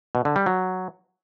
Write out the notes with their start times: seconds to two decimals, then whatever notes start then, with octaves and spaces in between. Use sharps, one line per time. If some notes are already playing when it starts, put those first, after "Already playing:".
0.15 B2
0.25 D3
0.36 G3
0.46 F#3